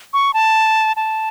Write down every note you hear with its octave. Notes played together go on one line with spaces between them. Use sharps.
C#6
A5
A5